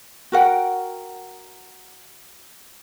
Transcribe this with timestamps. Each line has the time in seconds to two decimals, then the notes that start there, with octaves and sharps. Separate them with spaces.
0.32 F#4 A#4 F#5 G5